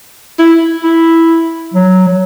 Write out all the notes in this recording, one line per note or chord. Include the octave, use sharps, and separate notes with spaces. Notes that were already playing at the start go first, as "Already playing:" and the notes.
E4
E4
F#3
F#3